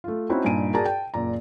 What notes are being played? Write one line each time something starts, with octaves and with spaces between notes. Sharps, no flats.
A3 F4
C4 C#4 D#4 E4 F#4 C5
G2 A#2 D#4 G#5 D7 D#7
F#4 G#4 A#4 D5 A5 A#5
G5 A5
F#1 A#2 D5 A#5